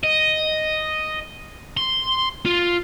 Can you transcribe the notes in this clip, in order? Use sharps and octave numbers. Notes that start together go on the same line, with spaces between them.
D#5
C6
F4